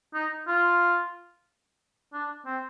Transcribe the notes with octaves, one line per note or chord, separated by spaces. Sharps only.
D#4
F4
D4
C4